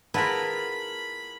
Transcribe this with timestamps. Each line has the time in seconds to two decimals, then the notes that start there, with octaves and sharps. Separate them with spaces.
0.14 E4 F4 G#4 A#4 B4 F#5 A5 B5